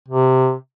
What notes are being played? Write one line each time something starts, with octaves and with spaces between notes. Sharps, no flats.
C3